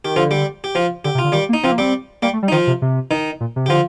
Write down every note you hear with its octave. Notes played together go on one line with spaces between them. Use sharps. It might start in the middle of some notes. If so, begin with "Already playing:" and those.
D#3 G4
D3 F3 F4
G3 G4
G4
F3 F4
D3 G4
C3
F4
D3
D#3 G3 G4
A#3
D#4
F3 C4 F4
A#3
G3 C4 G4
G3 A#3 G4
A3
G3
D#4
D#3 F3 F4
C3
C3
D#3 D#4
A#2
C3
D3 F3 F4 G4